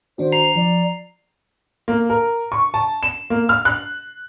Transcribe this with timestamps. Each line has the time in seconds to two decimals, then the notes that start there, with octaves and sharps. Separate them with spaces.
0.18 D#3 D4 F#4 C5
0.32 A#5 C7 F7
0.56 F3 D5
1.88 A#3
2.10 A#4
2.52 C#6
2.74 A5
3.03 E7
3.30 A#3
3.49 F6
3.65 F#6